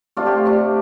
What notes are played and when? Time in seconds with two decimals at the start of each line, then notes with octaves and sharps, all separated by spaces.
0.17 C3 A3 D4 F4
0.26 G4
0.36 F4
0.45 C3 A3 D4